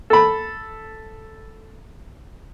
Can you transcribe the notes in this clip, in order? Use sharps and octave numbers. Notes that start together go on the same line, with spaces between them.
A4 B5